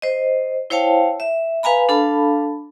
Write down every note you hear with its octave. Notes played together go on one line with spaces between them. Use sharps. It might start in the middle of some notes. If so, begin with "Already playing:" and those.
C5 D#5
E4 C5 C#5 F5 G5 A5
E5
B4 F5 G#5 A#5 B5
D4 A4 F5 A5 B5